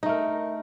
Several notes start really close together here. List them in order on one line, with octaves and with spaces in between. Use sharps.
D#4 A3 A#4